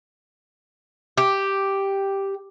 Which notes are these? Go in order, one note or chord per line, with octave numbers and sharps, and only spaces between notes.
G4